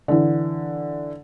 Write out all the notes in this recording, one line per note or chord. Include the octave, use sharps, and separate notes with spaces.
D3 E3